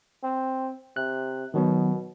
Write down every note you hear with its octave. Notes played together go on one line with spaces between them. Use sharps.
C4
C3 F#6
B2 D#3 F#3 B3